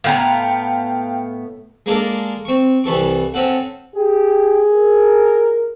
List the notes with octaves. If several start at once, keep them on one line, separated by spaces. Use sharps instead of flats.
A2 B3 F5 G5 A#5
G#3 A#3 D4 A4 A#4
C4 C#6
C2 E3 A4 C#6
C4 C#4 A4 F#5
G4 G#4
A#4